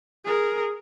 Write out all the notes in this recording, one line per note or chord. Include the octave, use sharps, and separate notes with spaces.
G#4 A#4